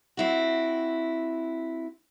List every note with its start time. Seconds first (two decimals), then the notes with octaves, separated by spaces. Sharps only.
0.17 C4 E4 F#4